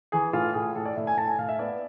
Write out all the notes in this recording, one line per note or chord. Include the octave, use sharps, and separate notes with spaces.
E3 G#4
A2 F4
A2 G#4
A2 A4
D5
A2 E5
G#5
A2 A5
G#5
A2 F5
E5
B3 D5